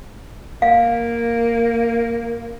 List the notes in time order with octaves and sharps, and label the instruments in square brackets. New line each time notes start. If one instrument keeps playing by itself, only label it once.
[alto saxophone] A#3 [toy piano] F5